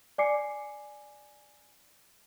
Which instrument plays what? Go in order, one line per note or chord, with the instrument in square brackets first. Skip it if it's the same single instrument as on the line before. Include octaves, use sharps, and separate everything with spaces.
[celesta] D5 G#5 D6 C7 C#7